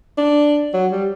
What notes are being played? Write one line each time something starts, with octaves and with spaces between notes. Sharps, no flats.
D4
F#3
G3